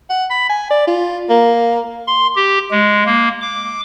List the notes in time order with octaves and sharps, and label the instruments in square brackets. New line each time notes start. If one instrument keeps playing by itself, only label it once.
[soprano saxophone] F#5
B5
G#5
D5
F4
A#3
[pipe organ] C6
G4
G#3
A#3
D6